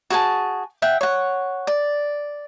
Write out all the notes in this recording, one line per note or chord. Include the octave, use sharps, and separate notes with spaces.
F#4 G#4 G#5 A5
E5 F#5 G5
C#5 F#5
D5